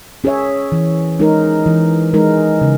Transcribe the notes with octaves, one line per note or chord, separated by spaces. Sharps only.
C#4 G#4 C#5 E5
E3
G#3 D#4 A#4
E3
G#3 D#4 A#4
C#3